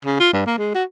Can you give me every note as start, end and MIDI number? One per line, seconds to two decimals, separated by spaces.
0.05 0.19 49
0.20 0.30 65
0.33 0.45 43
0.46 0.55 58
0.58 0.72 56
0.75 0.84 66